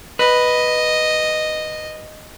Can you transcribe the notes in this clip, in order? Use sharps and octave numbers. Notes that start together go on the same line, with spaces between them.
B4 D#5